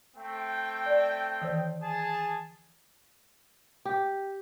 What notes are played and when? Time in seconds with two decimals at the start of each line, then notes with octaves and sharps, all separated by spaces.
0.17 A3 C4 G5
0.86 D5
1.42 D#3 E3 C5
1.82 G#4 A5
3.85 G4